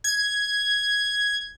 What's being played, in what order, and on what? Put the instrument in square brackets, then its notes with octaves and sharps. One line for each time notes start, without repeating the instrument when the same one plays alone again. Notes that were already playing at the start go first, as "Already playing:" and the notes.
[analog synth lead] G#6